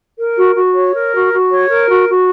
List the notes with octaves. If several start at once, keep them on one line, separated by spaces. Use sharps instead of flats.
A#4
F#4
F#4
C#5
A#4
F#4
F#4
C#5
A#4
F#4
F#4